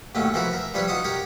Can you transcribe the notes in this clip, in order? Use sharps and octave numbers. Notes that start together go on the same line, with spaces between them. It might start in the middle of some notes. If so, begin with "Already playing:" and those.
D#2 A2 F#3 A3 C#4
E3 F3 F#4 A#4 B5
A#4 E5
F3 G3 D4 B4 C#5
D#4 F4 F#4 F#5 D#6
G4 A#4 C#5 F#5